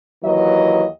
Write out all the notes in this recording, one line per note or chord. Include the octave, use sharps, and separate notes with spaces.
D#2 E3 F#3 D#5